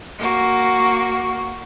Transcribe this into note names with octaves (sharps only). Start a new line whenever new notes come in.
A#3 F#4